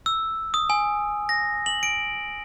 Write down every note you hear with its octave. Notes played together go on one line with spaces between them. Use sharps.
E6
D#6
G#5
A#6
F#7
D7